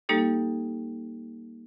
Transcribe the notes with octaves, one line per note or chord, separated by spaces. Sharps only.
G3 A#3 D#4 G4 A4